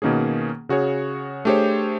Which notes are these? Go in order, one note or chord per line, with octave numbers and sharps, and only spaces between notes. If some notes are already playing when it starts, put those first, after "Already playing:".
B2 D#3 A#3 C#4 G#4
C#3 F#4 G#4 C#5
A3 D4 G4 G#4 C5 C#5